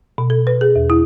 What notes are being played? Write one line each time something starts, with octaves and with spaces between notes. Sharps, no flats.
B2
A4
B4
G#4
E2
E4